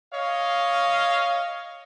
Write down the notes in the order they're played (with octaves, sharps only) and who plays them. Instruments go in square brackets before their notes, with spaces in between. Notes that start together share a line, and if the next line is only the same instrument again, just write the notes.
[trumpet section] C#5 D#5 F5